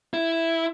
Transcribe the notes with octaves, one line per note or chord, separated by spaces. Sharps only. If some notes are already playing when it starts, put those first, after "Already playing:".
E4